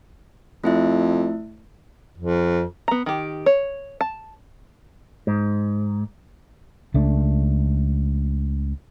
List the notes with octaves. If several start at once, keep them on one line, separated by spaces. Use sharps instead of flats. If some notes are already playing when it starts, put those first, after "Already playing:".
F2 A3 E4 E5
F2
B3 A#5
D#3 G4
C#5
A5
G#2
C#2 A3 D4